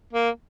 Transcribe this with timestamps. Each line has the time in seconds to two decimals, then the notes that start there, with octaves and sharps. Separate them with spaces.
0.13 A#3